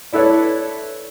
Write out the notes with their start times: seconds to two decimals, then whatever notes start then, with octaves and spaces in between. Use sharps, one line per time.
0.12 D4 E4 A4 B4 C#5